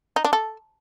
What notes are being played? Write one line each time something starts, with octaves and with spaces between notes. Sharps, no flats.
D#4
D4
A4